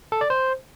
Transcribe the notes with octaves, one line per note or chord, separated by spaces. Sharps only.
A4
D5
C5